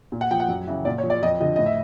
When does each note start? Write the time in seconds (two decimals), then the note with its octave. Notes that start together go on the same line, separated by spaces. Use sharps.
0.12 A#2
0.21 F#5
0.31 F3 G5
0.40 F#5
0.48 F#2
0.67 C#3 E3
0.85 A#2 D5
0.98 C#5
1.03 F3
1.10 D5
1.22 F2 D#5
1.40 D3 F3 D#5
1.56 A2 D#5
1.66 E5